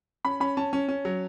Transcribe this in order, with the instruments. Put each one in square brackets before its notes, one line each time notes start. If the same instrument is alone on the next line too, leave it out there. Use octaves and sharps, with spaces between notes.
[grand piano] C#4 B5
C#4 B5
C#4 A5
C#4
C#4
F#3